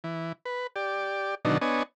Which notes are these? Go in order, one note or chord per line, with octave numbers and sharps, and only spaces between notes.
E3
B4
G4 D5
B2 D3 D#3 F#3 D4 D#4
B3 D4 C#5 D#5 G#5